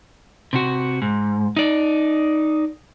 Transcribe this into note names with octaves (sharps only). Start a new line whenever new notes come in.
C3 F#4
G#2
D#4 D5